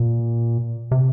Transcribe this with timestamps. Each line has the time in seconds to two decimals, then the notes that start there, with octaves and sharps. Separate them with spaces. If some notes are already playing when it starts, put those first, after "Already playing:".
Already playing: A#2
0.91 C3